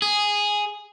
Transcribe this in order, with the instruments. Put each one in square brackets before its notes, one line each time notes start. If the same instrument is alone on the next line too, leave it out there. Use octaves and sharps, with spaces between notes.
[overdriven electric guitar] G#4